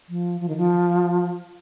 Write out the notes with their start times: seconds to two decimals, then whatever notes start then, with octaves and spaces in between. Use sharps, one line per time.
0.09 F3
0.41 F3
0.49 D#3
0.57 F3